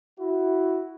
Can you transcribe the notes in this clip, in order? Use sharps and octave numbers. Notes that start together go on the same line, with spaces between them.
E4 F#4